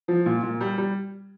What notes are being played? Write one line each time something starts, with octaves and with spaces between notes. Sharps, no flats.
F3
A#2
A#2
G3
G3